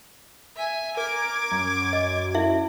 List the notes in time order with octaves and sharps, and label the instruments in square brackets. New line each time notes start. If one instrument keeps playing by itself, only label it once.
[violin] E5 G#5
[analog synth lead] A#4 [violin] D6 G#6
[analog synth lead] F#2
[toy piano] D#5
E4 E5